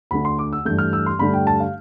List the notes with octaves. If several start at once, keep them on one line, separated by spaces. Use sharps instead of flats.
D2 D3 A3 B5
C6
D6
E6
G2 E3 A3 G6
F6
E6
C6
G2 D3 A3 B5
G5
A5
F5